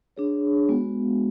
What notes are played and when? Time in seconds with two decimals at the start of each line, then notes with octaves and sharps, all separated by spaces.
0.17 D4 G#4 C#5
0.68 G#3 B3 F#4